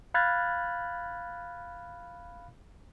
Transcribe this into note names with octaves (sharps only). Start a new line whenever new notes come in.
F5 B5 F6 F#6 G#6 A6